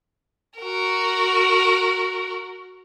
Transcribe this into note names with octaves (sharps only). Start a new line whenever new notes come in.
F#4 A#4